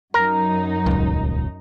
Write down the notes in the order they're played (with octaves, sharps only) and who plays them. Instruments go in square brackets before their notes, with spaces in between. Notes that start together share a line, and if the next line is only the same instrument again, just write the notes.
[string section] F#2 D#4 [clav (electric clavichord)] A#4
[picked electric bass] D#1 C#2